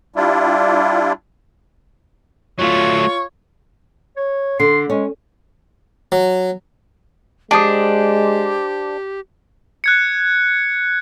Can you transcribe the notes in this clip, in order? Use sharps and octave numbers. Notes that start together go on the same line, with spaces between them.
G3 D4 E4 F4
F#3 A3 F4 C#5
C#5
D3 C6
G#3 C#4
F#3
G#3 D4 G4 C5 A5 D#6
F#6 G#6 C#7